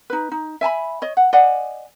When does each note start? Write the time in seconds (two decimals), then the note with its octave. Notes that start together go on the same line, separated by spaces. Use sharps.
0.10 D#4 B4
0.32 D#4
0.61 E5 G#5 A5 B5
1.02 C#5 D#5
1.17 F#5
1.33 D5 D#5 F#5 G#5